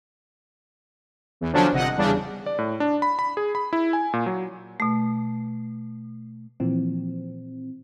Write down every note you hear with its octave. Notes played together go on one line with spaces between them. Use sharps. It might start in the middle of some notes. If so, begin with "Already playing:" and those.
E2
D3 F3 F#3 C#4 D4
G1 C3 D#5 F#5 F#6
E2 C#3 G3 D4
D5
A2
D4
B5
B5
G#4
B5
E4
G#5
A#2
F#3
B2 A3
A#2 E3 F3 C4